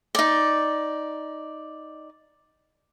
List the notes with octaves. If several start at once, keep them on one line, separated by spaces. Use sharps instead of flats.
D#4 D5